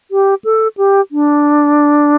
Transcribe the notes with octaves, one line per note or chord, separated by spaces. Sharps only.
G4
A4
G4
D4